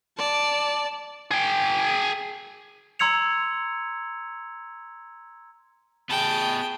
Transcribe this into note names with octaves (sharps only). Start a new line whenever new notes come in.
D5 A5
G#4 G5
A#5 C6 E6 G#6 C#7 F7
B3 G#4 G5 A5